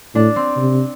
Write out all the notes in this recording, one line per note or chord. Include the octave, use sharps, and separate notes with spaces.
A2 D4
C4
C3